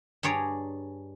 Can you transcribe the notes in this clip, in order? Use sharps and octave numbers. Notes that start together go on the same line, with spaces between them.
G2 G#4 C#5 D5 A#5